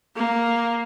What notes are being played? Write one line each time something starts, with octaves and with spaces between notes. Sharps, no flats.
A#3